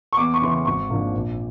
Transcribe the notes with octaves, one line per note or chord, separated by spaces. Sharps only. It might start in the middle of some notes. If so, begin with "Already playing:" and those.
C#6
E2 D6
C#6
C#3 E3 C6
C#6
G#1 C#6
G#2 F3 A#3 D4
A#1